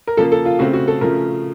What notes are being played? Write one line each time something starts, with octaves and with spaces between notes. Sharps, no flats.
A#4
C#3 F3 A#3 A4
A4
F4
C#3 A3 C4 F#4
F#4
A4
C#3 F3 A3 A#4